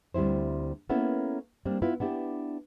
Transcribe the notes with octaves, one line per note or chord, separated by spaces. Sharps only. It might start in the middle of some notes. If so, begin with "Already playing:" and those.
D2 G3 C4 E4 C5
A#3 B3 C#4 E4 A4
G3 A#3 C4 D4
B3 E4 F4 B4
B3 D4 E4 G4